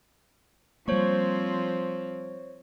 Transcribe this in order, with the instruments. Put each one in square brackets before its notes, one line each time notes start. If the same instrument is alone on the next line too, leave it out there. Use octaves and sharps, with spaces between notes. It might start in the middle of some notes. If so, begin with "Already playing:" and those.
[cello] F3 C4 [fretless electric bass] G3 A#3 [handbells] C5 C#5 C#6